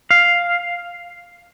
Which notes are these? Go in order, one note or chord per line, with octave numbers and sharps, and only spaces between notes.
F5